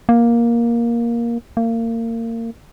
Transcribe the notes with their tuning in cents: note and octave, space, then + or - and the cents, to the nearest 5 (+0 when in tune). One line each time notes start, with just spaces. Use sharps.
A#3 +10
A#3 -30